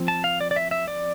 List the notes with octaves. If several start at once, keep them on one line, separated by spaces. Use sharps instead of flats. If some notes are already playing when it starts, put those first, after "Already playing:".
Already playing: F3 C4
A5
F5
D5
D5
E5
E5
D5